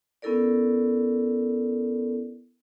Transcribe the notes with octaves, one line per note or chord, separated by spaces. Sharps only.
B3 C#4 E4 A4 A#4 D5